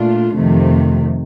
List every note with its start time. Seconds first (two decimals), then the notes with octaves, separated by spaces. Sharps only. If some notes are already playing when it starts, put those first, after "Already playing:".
Already playing: A#2 A3 D4 F4
0.35 F2 C3 D#3 A3